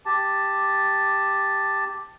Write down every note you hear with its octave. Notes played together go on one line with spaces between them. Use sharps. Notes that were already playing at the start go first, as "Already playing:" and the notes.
G4 A5